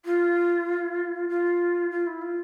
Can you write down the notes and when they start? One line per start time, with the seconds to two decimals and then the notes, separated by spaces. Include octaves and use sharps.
0.05 F4
1.29 F4
1.91 F4
2.07 E4
2.22 F4